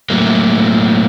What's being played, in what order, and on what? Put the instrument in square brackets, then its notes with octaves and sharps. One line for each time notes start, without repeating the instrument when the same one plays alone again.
[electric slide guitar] A2 F#3 A3 A#3